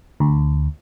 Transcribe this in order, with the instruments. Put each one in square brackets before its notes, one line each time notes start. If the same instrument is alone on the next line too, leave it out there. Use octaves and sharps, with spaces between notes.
[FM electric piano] D2